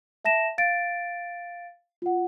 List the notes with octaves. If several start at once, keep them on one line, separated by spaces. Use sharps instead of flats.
E5 A5 A#6 E7
F5 A6 D7
F4 F#5